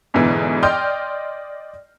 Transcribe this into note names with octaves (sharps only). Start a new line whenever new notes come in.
E2 G#2 B2 D3 E3
D5 D#5 G5 C6 F6 G6